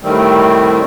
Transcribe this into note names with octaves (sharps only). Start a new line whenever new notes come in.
A2 D#3 G3 A3 C4